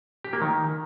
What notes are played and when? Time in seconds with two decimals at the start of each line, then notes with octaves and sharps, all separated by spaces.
0.25 G4
0.33 A#3
0.42 D#3